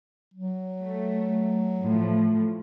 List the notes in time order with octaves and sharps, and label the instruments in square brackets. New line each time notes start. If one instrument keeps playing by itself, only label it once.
[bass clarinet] F#3
[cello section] A3
A2 F3